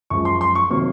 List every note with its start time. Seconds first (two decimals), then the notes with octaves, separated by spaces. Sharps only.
0.10 F#2 F3 G#3 C#6
0.25 C6
0.41 C6
0.55 C#6
0.70 C3 D#3 F#3 A#3 C#6